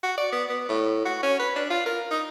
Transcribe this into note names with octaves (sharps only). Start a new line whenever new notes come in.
F#4
D5
B3
B3
A2
F#4
C#4
B4
D4
F4
A#4
D#4